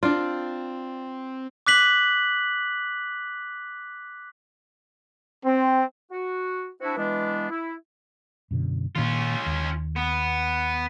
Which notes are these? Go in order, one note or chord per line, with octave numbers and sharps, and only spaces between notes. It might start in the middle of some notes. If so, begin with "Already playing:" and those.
C4 D4 F4 D5
D6 F#6 B6 F#7
C4
F#4
C4 D4 E4 F#4
E3 G#3 B3 D4
E4
F#2 B2 D3
A#2 D#3 C#4 F4
D#2
B3